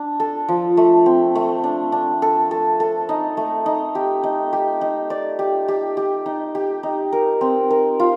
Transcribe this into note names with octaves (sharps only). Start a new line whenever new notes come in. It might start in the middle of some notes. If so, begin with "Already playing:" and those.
Already playing: D4
A4
F3
A3
C4
A3
D4
D4
A4
A4
A4
D#4
A3
D#4
G4
D#4
G4
D#4
D5
G4
G4
G4
D#4
G4
D#4
A#4
C4
A#4
F4